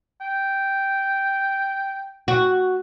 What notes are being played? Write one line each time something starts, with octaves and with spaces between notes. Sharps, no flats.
G5
F#4